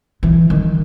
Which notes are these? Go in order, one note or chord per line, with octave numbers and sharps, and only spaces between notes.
E3
D#3